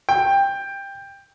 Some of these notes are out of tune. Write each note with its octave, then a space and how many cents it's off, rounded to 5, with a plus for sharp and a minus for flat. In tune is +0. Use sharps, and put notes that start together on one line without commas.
G5 +15